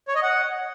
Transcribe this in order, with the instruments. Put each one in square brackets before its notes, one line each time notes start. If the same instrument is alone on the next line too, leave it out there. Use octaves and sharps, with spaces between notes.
[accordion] C#5
D#5
F#5